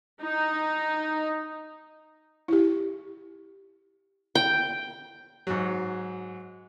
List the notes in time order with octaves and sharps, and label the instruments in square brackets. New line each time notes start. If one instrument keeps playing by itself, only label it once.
[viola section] D#4
[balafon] E4 G4
[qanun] G5
[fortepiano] G#2 F#3